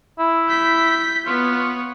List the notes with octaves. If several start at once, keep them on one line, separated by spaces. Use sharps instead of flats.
E4
G6 B6
B3 F4 C#5